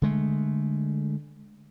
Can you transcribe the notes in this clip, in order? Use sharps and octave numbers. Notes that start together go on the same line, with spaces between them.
D3 G#3 A3